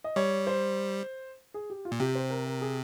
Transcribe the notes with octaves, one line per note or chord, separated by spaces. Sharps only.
D#5
G3 C#5
C5
G#4
G4
F4
A#2
C3 G4
C5
A#4
A#4
G#4